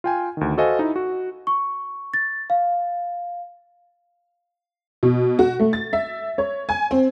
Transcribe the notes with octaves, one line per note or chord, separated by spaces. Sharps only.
F4 G5 G#5
D2 D#3
F#4 A4 C5 D#5 F5 G#5
D#4 E4
F#4
C#6
A6
F5
B2
F#4
A3
A6
E5
C#5
G#5
C4